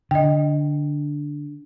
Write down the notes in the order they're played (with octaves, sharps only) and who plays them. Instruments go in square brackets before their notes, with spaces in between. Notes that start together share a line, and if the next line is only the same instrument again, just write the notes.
[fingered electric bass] D3 [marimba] D#5 G5